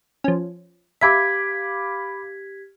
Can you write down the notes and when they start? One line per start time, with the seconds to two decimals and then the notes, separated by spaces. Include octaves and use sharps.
0.24 F3 C#4
1.01 G4 E5 F5 B5 D6 G#6 B6